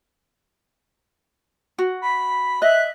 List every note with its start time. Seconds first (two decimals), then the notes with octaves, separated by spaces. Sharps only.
1.78 F#4
2.02 B5
2.62 D#5 E5 F#6